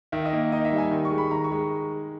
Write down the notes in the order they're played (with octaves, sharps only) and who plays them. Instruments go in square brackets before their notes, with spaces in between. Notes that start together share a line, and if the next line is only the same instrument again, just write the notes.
[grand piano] D#3 E5
D#5
A#3
D#4 D#5
E5
G3
G#5
D#3
C#6
G#3
B5
D#3 A#5
C#6
G#3